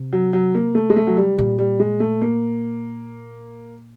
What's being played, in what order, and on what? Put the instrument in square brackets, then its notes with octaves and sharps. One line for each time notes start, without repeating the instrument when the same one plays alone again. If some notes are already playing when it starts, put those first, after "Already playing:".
Already playing: [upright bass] C3
[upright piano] F#3
F#3
A#3
A3
G#3
A3
F#3
G3
[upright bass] A#2 [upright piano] G3
[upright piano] G3
G#3
A3
A#3